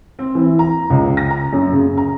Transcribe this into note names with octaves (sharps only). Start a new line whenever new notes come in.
C4
E3
A#5
C#2
A#6
A#5
F#2
C#3
A#5